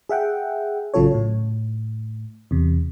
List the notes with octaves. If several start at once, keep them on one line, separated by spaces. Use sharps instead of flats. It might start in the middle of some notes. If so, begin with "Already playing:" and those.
G#4 E5 F#5 G5
A1 C#3 F#3 F4 A4 C#5
A2
E2 C3